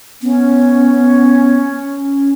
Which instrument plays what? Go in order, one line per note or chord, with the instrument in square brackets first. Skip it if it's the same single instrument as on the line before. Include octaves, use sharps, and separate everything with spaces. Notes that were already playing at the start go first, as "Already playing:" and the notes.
[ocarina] B3 [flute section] C#4